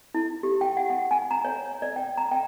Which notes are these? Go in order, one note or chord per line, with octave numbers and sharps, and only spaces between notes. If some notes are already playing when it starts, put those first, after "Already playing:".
E4
G4
G5
F#5
F#5
G#5
A#5
C#5
D5
G5
A#5
G5